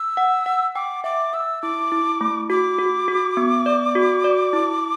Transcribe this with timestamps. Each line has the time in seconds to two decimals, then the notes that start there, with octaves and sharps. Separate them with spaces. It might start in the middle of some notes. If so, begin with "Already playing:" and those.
Already playing: E6
0.17 F#5
0.46 F#5
0.75 G5 D6
1.04 E5 D6
1.33 E5 E6
1.62 E4 D6
1.92 E4
2.21 A3
2.50 F#4 D6
2.78 F#4
3.08 F#4
3.37 B3
3.66 D5
3.95 F#4
4.24 D5
4.53 E4